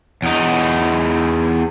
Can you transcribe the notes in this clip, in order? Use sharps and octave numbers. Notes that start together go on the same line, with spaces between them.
E2 D#4